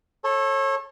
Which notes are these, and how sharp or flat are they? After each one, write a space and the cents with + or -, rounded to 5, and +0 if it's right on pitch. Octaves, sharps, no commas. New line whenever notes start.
A4 +0 C#5 -30